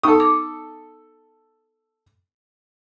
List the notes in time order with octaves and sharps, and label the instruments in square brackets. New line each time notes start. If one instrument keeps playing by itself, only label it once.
[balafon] B3 D#4 C#6 [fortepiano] A4 D#6
[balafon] D6